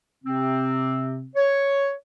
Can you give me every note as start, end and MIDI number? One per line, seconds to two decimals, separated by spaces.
0.24 1.26 48
0.24 1.26 60
1.36 1.92 73